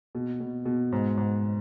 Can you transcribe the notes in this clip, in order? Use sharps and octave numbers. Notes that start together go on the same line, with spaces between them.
B2
B2
B2
G#2
G#2